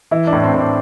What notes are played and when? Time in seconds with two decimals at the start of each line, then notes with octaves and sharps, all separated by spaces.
0.11 E3 E4
0.27 D4
0.33 A2
0.38 D4
0.44 C4
0.53 A2
0.59 D4